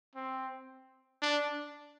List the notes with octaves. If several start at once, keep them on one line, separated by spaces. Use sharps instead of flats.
C4
D4